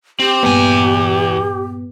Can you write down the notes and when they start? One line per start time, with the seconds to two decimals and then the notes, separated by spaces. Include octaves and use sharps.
0.19 C4 G4
0.43 E2 G2 A#2 B3 G#5